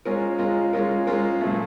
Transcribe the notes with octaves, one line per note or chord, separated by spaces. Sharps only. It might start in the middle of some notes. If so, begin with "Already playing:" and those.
G#3 C#4 F4 A#4
G#3 C#4 F4 A#4
G#3 C#4 F4 A#4
G#3 C#4 F4 A#4
A#2 F#3 A3